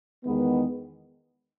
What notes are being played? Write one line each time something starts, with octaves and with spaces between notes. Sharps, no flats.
E2 D#3 G#3 B3